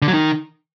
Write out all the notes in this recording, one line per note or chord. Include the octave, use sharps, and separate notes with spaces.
D3
F#3
D#3